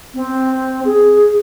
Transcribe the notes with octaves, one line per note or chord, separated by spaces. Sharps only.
C4
G#4